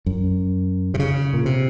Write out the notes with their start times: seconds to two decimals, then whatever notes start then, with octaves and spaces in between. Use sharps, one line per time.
0.06 F#2
0.94 C3
0.99 C#3
1.34 A#2
1.45 C3